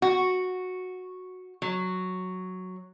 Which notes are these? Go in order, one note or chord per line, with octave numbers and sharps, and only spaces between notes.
F#4
F#3